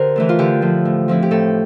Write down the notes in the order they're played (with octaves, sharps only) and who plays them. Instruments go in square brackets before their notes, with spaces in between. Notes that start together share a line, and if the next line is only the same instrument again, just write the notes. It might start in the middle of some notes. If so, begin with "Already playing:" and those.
Already playing: [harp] D3 G4 A#4 C5
E3 A3 D4
F4
D3 G4
F3 A3
A2
F3 C4 E4
G4
A2 A4